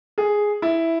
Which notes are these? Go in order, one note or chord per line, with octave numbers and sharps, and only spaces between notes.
G#4
E4